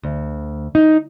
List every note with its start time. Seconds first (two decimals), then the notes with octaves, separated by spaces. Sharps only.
0.04 D2
0.75 D#4